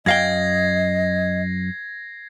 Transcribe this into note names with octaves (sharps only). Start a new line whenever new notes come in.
F#2 D#5 F5 G5 G#6 A#6 C7